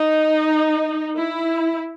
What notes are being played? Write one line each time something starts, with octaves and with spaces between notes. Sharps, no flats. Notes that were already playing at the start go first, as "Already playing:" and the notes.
Already playing: D#4
E4